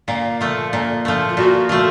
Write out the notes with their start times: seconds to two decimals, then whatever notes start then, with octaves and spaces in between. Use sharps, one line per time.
0.08 A#2 F5
0.41 F3 A3
0.73 A#2
1.05 F3 A3
1.29 F4
1.37 A#2 F#4
1.69 F3 A3